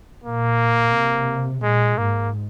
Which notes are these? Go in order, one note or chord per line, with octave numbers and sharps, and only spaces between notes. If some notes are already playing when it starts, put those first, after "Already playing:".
A#2 A#3
C3
A#2 G#3
G#2 A#3